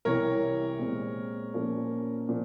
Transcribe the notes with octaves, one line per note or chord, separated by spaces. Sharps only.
C2 C3 E3 A#4 C#5
A#2 G#3 C4
A#2 F3 A#3 C#4
A#2 F3